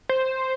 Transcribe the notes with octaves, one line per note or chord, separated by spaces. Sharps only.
C5